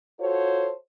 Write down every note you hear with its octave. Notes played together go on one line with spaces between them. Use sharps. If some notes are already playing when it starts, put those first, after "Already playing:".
F4 F#4 A4 C5 C#5